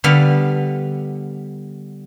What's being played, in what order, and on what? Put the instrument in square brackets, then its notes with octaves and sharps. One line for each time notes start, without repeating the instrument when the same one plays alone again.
[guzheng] D3 G3 B3 F5